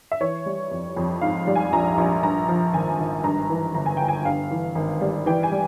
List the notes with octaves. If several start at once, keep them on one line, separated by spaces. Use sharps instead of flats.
E5
E3 C#5
G3
F2
F2
G#2 F5
G3
G#5
A#1 A#5
A#1
G2 A#5
F3
G#1 G#5
G#1
G2 A#5
E3
G1 A#5
G#5
G1 G5
G#5
G2 F5
E3
G#1
G3
E3 G5
G#5
G3